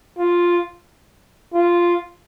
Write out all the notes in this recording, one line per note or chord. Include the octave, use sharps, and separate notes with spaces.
F4
F4